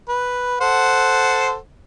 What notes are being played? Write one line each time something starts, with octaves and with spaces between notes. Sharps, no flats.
B4
A4 C5 F#5